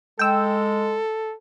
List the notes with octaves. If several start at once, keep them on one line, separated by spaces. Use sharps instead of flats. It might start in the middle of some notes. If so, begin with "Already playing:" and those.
G#3 A4 G5 E6